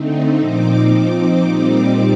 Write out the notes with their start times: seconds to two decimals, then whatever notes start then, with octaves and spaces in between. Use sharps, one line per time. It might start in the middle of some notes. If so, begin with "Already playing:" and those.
Already playing: D3 A3 C4 D#4
0.38 A#2 F3 C4 D#4 D6
0.89 F3 C4 D#4
1.41 A#2 G3 C4 D#4